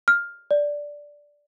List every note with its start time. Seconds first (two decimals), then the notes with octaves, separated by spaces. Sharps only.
0.08 F6
0.51 D5